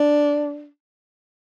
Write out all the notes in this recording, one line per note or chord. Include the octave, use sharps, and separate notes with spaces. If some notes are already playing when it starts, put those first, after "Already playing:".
Already playing: D4